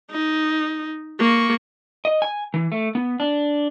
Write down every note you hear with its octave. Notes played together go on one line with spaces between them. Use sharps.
D#4
A#3 C#6
D#5
G#5
E3
A3
B3
D4